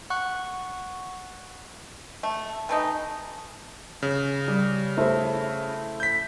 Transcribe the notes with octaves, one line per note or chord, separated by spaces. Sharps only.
F#5 C#6 F#6
A3
E3 A3 D#4
C#3
G3
A3 E4 C5
G6 B6